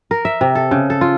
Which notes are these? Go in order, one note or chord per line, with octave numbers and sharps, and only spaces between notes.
A#4
E5
C3
A4
C#3
A4
F4